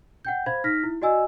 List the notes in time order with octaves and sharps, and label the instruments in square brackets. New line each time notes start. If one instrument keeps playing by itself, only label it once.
[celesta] F#5 G5 G6
C5 F5 B5 G#6
D#4 F6 A#6 B6
E4
F#4 D5 D#5 G#5 E6